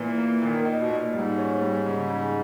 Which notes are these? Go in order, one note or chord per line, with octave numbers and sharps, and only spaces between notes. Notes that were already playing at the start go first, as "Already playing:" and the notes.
Already playing: A#2 E3 A#3
A#3
A#2 D#3
D#4
B2
A#2
G#2 G3
C#4
G3
C#3
C#3